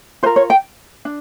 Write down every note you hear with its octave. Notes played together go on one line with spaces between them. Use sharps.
F4 A#4 C5
C#5
G5
D4